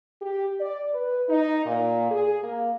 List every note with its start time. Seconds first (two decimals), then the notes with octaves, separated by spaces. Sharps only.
0.22 G4
0.60 D5
0.93 B4
1.29 D#4
1.65 A#2
2.11 G#4
2.43 A#3